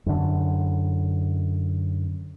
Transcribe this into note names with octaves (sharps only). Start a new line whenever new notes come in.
F#2 D3